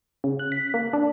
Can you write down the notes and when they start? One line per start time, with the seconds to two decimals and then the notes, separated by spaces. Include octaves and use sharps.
0.24 C#3
0.39 F#6
0.52 B6
0.74 A#3
0.93 D4